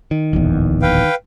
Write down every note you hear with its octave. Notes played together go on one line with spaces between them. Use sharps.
D#3
D1 A#1 E2
B4 F5 G5